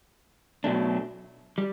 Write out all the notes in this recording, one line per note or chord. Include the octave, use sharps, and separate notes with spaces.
B2 F#3 A3 D4
G3